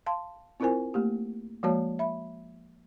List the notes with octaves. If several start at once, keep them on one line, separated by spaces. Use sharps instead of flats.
F5 A5 C6
C4 E4 F4 A#4 C5 G#5
A3 A#3 G4
F3 G#3 A#3 F#4 C#5 A5
E5 B5